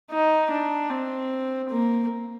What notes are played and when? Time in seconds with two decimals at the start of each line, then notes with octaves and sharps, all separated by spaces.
0.11 D#4
0.51 D4
0.90 C4
1.70 A#3